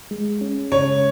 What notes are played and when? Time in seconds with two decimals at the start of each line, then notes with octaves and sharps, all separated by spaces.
0.11 G#3
0.41 C#4
0.72 C#3 C#5